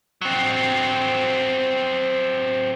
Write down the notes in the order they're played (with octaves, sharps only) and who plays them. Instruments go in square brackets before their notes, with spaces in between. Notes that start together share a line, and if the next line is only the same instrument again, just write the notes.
[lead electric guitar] F#3 C4